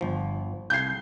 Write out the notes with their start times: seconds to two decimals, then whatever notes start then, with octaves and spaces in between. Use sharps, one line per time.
0.01 G1 F3
0.70 C2 G6 G#6 C7